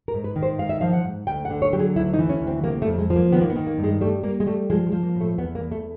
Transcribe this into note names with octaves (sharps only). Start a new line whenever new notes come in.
A#4
G#2
B4
D#3
C5
G#2 F5
E5
F3 F5
F#5
G#2
D2 G5
F#5
D3
C#5
F#3 G4
G#4
D2 E4
D#4
E3
C#4
D2
C4
C3 A#3
A3
F2
G#3
F3
A#3
D#3 B3
A#3
B3
D#3
A#3
G2
G#3
G3 A3
G3 A#3
G#3
G3 A3
F3 G#3
G#3
F3
A#3
A2
A3
E2 B3
A#3
E2
A3